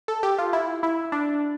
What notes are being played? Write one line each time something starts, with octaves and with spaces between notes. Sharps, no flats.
A4
G4
F4
E4
E4
D4